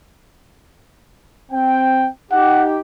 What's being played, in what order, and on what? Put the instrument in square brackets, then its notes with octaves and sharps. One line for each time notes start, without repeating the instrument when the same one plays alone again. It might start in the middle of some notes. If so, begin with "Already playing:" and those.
[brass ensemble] C4 G5
[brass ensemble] D#4 G4 [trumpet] F#5